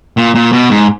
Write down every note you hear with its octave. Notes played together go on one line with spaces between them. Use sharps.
A#2
A#2
B2
G#2